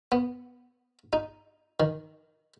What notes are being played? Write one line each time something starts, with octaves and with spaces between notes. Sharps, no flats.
B3
D#4
D#3